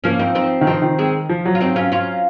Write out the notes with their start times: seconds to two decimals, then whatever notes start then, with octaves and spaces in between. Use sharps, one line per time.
0.04 F3 A#3 C#4
0.19 C4 D#4
0.35 C4 D#4
0.61 D#3
0.67 F3 C4 D#4
0.82 D#3
0.98 G#3 C4
1.29 F3
1.46 F#3
1.55 F4
1.60 C4 D#4
1.76 C#4 F4
1.92 C#4 F4